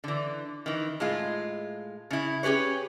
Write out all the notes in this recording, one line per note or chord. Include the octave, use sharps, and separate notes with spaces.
D3 E3
D#3 E3
A2 G#3 F4
C#3 E4
C#4 G4 G#4 B4 C#5